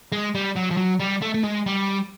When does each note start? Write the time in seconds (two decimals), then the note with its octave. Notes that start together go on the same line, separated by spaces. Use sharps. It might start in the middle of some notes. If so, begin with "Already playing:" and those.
0.12 G#3
0.35 G3
0.56 F#3
0.71 F3
0.77 F#3
1.00 G3
1.22 A3
1.34 A3
1.44 G#3
1.66 G3